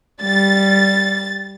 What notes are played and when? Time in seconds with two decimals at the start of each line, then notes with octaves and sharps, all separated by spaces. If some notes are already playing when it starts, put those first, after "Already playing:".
0.23 G3 A6